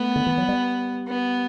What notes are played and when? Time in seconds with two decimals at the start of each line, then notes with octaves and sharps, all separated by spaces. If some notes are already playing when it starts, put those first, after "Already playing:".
Already playing: A3 B3
0.16 D3
0.27 E3
0.38 F#3
0.49 G3
1.07 B3